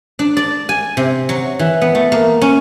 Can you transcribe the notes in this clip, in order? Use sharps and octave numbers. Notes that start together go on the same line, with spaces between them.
D4
D5
G#5
C3
F#3
E3
B3
A3
A#3
C#4